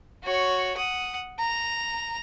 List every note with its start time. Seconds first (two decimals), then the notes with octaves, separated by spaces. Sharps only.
0.24 F#4 C#5
0.77 F#5 D#6
1.39 A#5